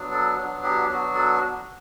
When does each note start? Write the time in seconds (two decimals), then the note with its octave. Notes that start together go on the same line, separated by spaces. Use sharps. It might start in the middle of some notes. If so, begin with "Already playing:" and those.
Already playing: F#3 B3 D4
0.12 A4
0.37 F#3 B3 D4
0.63 G4
0.89 F#3 B3 D4 F#4
1.15 A4